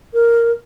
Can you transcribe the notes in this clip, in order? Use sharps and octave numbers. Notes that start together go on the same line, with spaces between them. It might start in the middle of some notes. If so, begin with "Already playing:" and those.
A#4